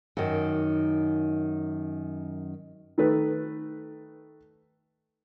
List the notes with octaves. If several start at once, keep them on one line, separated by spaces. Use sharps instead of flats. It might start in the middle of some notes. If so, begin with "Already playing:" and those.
F#2 D#3
D#3 A3 B4